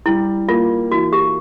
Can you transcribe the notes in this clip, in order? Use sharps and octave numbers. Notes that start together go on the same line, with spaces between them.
G3 E4
A#3 F4
E3 F#4
G4